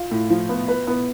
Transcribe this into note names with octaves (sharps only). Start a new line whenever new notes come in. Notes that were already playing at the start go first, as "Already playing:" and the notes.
Already playing: F4
A2
F3
B3
B4
B3